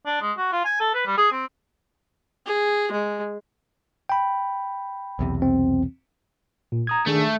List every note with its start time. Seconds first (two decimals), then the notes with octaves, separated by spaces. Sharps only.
0.06 D4
0.21 G#3
0.37 F#4
0.52 F4
0.65 G#5
0.80 A4
0.94 B4
1.06 G3
1.18 G#4
1.32 C4
2.46 G#4
2.92 G#3
4.09 G5 B5
5.19 B1 E2 C3
5.42 C4
6.72 A#2
6.87 A#5 D#6 G#6
7.07 D#3 A3 D4 G#4